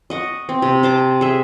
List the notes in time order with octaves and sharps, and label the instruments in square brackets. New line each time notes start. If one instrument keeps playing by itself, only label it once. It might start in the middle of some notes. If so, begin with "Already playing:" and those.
[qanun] D#5 F#5 C#6
C4
C3
C5 A5 D6
G#4 E5